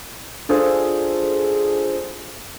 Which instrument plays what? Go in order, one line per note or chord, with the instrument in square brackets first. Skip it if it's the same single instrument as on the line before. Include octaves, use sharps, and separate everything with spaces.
[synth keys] D4 F4 G#4 A4 C5